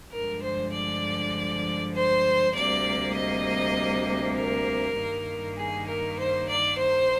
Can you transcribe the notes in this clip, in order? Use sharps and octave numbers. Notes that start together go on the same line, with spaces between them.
G2 D3 F3 G#3 A#4
C5
D5
C5
D2 C3 G3 A#3 D5
D#5
A#4
G2 D#3 A#3
G#4
A#4
C5
D5
C5